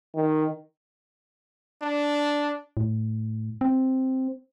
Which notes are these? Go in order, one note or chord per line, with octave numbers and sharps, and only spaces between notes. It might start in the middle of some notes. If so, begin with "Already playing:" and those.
D#3
D4
A2
C4